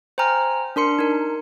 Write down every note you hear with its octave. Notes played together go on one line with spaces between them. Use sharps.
C5 G5 G#5 A#5 F6
D4 A#4 C6 C#7
D#4 A#4